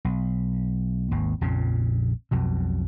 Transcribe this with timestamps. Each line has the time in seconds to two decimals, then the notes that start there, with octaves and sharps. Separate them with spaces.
0.05 B1
1.11 G#1 D#2
1.41 A#1 F2 A#2 C#3
2.31 B1 F2 B2